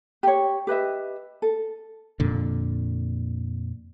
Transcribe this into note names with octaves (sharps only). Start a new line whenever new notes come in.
G4 C#5
G4 B4 D#5 E5
A4
F2 A#2 D3